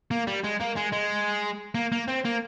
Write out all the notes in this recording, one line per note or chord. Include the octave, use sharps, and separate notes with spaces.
A#3
G3
G#3
A#3
G#3
G#3
A#3
A#3
C4
A#3